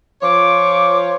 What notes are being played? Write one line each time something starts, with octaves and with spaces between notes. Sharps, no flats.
F3 F4 C#5 D6